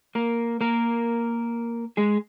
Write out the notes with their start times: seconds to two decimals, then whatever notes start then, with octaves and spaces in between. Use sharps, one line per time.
0.15 A#3 A#4
0.61 A#3 A#4
1.97 G#3 G#4